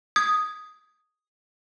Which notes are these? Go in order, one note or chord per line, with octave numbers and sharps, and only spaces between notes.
D#6 G#6